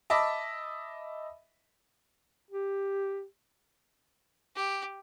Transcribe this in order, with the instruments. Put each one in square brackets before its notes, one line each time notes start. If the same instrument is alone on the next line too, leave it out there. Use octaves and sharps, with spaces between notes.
[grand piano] D#5 E5 A5 B5 D6
[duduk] G4
[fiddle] G4